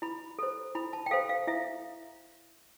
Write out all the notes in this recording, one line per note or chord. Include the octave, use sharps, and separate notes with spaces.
E4 B5
A4 C5
E4 B5
A5
G5
A4 C5 F5
F5
E4 E5